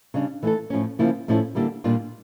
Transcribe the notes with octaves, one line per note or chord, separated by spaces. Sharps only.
C#3 G3 D4
E3 A3 E4 A4
A2 F3 C#4
C#3 F3 A#3 E4
A2 F3 A3 C#4 E4
D3 G3 A#3 E4 G4
A#2 G3 A#3 D4 F4